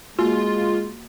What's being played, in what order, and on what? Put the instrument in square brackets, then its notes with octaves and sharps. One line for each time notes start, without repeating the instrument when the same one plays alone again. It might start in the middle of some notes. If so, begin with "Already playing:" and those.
[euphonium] G#3 [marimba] A#3 F#4 [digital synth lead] F4